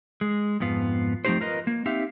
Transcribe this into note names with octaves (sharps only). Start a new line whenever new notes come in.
G#3
F2 G#2 B3 F4
F3 A3 C4 D#4 G4 C5
F4 A#4 B4 D#5
A#3
C4 D#4 G4 E5 F5